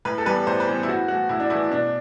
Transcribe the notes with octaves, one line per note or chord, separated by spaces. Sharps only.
A2 B4
A4
E3 G3 B3 B4
A2 C5
B4
E3 G3 B3
E4
A2 F#4
E3 A3 F#4
A2 E4
D4
E3 A3 E4
B2 D4